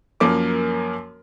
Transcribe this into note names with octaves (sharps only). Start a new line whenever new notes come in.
F#2 F3 A#3 A#4 D6